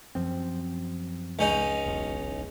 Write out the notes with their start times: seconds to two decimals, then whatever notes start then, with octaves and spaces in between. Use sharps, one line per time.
0.15 F#2 F3 C4
1.39 C#2 C#4 D#4
1.86 E1 B1